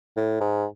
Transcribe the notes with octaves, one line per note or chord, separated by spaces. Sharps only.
A2
G#2